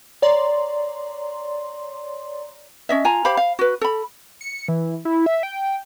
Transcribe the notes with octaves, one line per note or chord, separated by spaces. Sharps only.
C#5 D5 A#5 C6
C#4 D#5 E5
F4 G#5 A#5
G4 C5 F5 B5
F5
F#4 B4
A4 B5
C#7
E3
E4
E5
G5